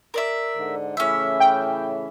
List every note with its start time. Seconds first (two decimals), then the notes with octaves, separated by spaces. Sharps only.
0.14 A#4 D5 E5
0.57 G#2 D3
0.97 A2 C#3 E3 C#4 E5
1.40 G5